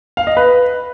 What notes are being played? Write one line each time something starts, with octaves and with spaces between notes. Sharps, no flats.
F5
D#5
B4